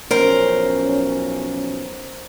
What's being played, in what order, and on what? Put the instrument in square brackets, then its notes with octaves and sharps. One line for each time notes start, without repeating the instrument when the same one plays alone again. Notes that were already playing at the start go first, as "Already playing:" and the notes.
[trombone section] B1 F3 C#4 [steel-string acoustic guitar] A#4 C5